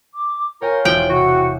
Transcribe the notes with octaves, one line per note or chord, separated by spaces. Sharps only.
D6
F4 A#4 C#5 G5 G#5
E1 F3 E4 G5
C3 F#4 F#5